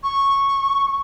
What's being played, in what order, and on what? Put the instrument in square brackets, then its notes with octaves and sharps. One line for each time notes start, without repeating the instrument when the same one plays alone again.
[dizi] C#6